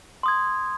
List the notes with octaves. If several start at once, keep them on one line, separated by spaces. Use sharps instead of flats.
C6 D#6 G#6